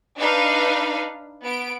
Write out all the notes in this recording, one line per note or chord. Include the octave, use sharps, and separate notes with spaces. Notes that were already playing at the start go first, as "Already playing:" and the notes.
D4 D#4 B4 F5
B3 D7